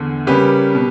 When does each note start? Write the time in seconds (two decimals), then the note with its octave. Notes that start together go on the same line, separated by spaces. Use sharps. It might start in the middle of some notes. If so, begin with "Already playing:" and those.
Already playing: E2 D3
0.27 C#3 G3 A#3 C#4 G4 B4
0.74 B2